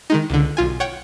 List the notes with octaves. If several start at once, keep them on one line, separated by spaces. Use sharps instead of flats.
D#3 G#3 D#4
C#2 D3
B1 F4 G#5
C#5 F#5 G5